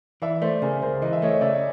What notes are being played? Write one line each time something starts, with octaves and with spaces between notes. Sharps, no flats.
E3 D5 E5
A3 C5 D5
C#3 G#4 A#4
C#2 A#4 C5
E3 D#5
E5
A3 C#5 D#5
C#3 D5 E5